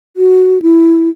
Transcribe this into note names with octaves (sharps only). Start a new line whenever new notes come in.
F#4
E4